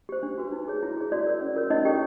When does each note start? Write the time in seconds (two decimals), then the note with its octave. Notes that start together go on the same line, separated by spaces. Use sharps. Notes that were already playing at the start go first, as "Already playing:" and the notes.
0.09 G4 C5
0.23 D4
0.38 F#4 B4
0.52 D#4
0.68 G#4 C#5
0.83 E4
0.97 G#4 C#5
1.12 F#4 D5
1.26 A#4 C#5
1.41 C#4
1.56 F4 A#4 C#5
1.70 C#4 D#4 D#5
1.85 E4 G4 A4 C#5 G5